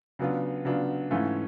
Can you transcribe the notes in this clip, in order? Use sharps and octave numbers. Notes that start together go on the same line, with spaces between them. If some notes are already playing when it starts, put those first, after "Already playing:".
C#3 F#3 B3 D4 F4
C#3 F#3 B3 D4 F4
G#2 E3 A3 C#4 F4